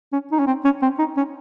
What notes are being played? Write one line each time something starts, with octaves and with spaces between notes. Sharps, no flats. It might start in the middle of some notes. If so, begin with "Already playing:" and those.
C#4
D#4
C#4
C4
C#4
C4
D#4
C#4